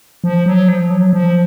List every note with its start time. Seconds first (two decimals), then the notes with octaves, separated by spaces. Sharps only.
0.24 F3
0.46 F#3
0.68 F3
0.91 F#3
1.13 F3